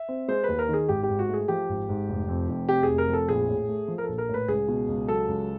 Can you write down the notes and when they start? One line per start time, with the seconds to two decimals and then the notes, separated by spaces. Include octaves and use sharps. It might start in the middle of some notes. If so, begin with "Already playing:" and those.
Already playing: E5
0.09 C4
0.28 G#3 C5
0.44 D#2 B4
0.59 A#4
0.68 D#3 G#4
0.89 G#1 G4
1.03 G4
1.09 G#2
1.19 F#4
1.29 A3 G#4
1.48 F3 G4
1.69 G#1
1.89 G#2
2.09 F1
2.28 F2
2.49 F1
2.68 C3 G4
2.83 G#4
2.88 F1
2.98 A#4
3.08 F2
3.13 A4
3.28 A#1 G#4
3.49 A2
3.68 A3
3.88 F3
3.98 A#4
4.04 A#1 A4
4.18 A#4
4.29 A2
4.34 B4
4.48 C#2 G#4
4.68 B2
4.88 C#2
5.08 F#3 A4
5.28 C#2